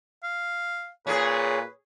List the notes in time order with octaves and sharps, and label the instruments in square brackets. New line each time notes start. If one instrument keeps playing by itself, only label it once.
[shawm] F5
[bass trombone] A#2 [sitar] C#4 G#4 [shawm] B4